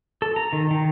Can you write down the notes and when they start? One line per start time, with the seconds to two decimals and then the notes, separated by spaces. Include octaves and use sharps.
0.22 A4
0.36 A#5
0.53 D#3
0.71 D#3